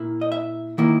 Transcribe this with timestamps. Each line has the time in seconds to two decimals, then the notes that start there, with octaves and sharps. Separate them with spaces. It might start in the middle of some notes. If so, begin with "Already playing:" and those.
Already playing: A#2 A#3 E4
0.21 D#5
0.32 E5
0.78 D#3 A#3 E4